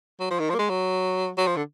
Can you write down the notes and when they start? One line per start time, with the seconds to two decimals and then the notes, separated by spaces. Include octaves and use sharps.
0.20 F#3
0.30 F3
0.39 D#3
0.50 F3
0.54 A#3
0.58 G#3
0.69 F#3
1.37 F#3
1.47 F3
1.56 D3